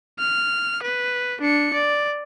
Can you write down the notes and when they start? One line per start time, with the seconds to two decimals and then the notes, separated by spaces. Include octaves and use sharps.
0.19 F6
0.83 B4
1.41 D4 C#7
1.74 D5